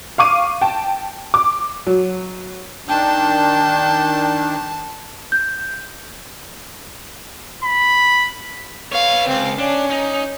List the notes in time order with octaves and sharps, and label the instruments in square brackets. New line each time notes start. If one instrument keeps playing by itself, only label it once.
[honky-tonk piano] F5 C#6 D6 D#7
G5 A5
D6
F#3
[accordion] D#3 D4 [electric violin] G5 [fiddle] A5
[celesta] G6
[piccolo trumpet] B5
[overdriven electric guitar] B3 C#5 [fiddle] F5
[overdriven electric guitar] C#2 [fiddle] C4 F5
[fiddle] C#4 [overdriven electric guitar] D4
[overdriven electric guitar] D#4